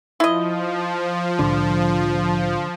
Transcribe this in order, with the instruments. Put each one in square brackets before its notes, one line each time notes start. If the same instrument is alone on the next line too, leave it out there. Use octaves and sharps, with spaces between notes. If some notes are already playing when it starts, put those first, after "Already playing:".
[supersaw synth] F3 [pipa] E4 D#5
[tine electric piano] C2 A2 [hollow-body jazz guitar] D3